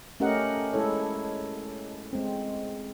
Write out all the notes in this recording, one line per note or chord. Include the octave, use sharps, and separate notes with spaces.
A3 C#4 G4 A#4 D#5 F#5
G#3 E4 A4 C#5
G#3 C4